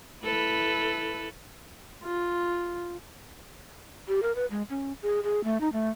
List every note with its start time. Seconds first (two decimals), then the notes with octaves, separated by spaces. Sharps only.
0.23 E4 A4 B4
2.04 F4
4.08 G4
4.23 A#4
4.36 B4
4.51 G#3
4.70 C#4
5.02 G#4
5.23 G#4
5.44 A3
5.61 D#4
5.73 A3